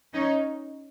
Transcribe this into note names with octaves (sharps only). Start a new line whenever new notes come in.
C#4 D#4